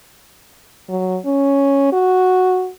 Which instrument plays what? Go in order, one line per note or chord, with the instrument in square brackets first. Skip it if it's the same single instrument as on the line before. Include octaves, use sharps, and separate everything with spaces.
[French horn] F#3
C#4
F#4